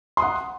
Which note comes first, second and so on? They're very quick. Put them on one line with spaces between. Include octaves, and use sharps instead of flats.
C6 D#6 F#5